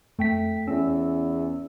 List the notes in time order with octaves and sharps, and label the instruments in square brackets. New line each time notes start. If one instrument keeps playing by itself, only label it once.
[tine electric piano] F2 G5 B6 [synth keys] A3
[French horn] E2 [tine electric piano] C#4 [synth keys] E6